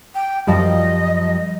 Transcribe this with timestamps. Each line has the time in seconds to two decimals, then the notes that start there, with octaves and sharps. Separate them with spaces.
0.15 G5
0.47 F#2 F3 G3 D#5